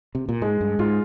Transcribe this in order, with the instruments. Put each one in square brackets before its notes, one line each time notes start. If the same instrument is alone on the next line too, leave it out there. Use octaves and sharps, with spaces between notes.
[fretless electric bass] C3
A#2
[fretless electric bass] G#2 [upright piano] G#3
[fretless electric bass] G2
[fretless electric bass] G#2 [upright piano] F4